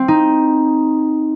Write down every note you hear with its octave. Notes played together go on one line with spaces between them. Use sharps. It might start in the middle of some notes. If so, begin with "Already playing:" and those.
Already playing: C4
D#4